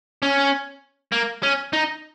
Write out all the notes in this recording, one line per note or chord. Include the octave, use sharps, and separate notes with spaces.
C#4
A#3
C#4
D#4